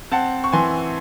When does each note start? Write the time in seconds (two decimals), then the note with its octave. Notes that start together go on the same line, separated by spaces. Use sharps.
0.12 C4 F#5 A5
0.44 C#6
0.52 E3 G#5 C6